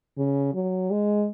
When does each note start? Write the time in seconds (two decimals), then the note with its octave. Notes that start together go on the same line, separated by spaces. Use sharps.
0.18 C#3
0.54 F#3
0.91 G#3